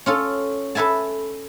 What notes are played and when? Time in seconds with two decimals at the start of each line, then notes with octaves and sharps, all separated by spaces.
0.06 C#4 F4 A4
0.75 A4 B4 E5 G#5 A5